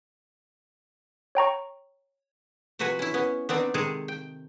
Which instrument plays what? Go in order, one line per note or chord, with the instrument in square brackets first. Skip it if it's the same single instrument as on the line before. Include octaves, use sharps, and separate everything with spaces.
[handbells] C#5 G5 A#5 C#6
[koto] C3 F3 F#4 B4 F#5 G#5
C#4 E4
B3 C#4
B3 C4 D4 D#4
C3 D#3 G#3 G#4 A4
G5